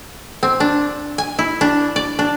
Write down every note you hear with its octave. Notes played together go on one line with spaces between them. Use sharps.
C4
D4
G#5
E4
D4
D5
D4